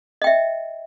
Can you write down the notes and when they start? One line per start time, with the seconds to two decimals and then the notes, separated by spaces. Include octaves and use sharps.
0.22 D#5
0.24 G5
0.27 E5